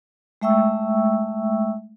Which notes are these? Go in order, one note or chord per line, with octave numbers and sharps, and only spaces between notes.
G#3 A3 E5 G5 C#6 E6